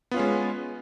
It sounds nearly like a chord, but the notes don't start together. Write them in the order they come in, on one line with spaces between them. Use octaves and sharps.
B3 F4 C#4 G#3